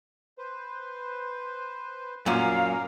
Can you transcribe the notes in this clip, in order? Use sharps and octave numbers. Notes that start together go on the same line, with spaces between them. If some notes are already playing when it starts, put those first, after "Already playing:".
B4 C5
F#2 A#2 C#4 A#4 F5